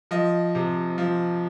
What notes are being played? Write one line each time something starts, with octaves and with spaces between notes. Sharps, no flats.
F3 D#5
C3
F3